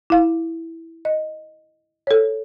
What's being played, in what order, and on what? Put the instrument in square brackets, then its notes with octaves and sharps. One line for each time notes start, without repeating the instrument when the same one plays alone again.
[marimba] E4 F5
D#5
A4 C#5